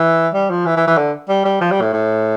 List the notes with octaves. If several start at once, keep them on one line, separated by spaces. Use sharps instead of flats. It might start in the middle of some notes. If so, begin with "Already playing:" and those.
Already playing: E3
G3
F3
E3
E3
E3
D3
G3
G3
F3
G3
A2
A2